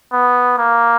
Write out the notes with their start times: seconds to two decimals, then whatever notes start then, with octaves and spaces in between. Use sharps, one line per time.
0.12 B3
0.58 A#3